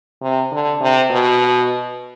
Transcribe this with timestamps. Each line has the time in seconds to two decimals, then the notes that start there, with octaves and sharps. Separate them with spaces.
0.22 C3
0.52 D3
0.81 C3
1.10 B2